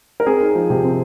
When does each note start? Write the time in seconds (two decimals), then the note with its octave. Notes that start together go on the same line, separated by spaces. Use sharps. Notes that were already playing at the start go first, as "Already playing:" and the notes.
0.20 A#4
0.26 C4 G#4
0.41 D#4
0.55 F3
0.70 C3
0.84 C4